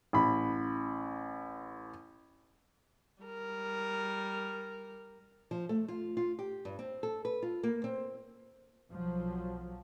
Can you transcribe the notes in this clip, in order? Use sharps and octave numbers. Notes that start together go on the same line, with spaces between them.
A1 B5
G3 A#4
F3
A3
F4
F4
G4
G2
C4
A4
B4
F4
A#3
C4
B1 F3 F#3